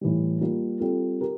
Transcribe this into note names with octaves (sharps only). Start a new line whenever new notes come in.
A2 E3 G3
G3 A#3 F4
G3 C4 F4 A4
G4 A#4